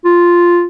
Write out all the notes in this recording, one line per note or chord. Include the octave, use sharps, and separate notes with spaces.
F4